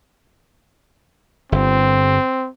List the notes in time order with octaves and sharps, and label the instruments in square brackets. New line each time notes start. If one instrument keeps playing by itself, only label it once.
[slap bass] G1 [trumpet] C4